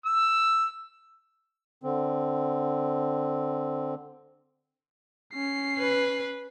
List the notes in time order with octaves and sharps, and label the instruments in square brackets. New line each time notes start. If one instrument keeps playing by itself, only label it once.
[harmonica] E6
[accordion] D3 C4
[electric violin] C#4 C7
[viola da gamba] B4